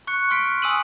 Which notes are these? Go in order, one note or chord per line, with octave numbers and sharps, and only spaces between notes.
C#6 F#6 C#7
C6 F6 B6 D7
G#5 D#6 E6 D#7 F#7